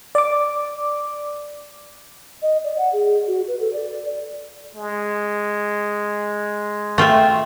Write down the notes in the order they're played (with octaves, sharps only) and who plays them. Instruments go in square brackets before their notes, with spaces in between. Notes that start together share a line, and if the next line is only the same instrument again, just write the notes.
[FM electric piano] D5 D6
[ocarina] D#5
D5
F#5
G#4
F#4
B4
A4
D5
[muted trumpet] G#3
[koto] A3 F4 [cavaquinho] E5 G5